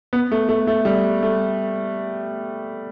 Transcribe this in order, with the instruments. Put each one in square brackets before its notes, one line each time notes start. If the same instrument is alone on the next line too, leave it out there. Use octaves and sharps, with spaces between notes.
[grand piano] B3
A3
A3
A3
G3
A3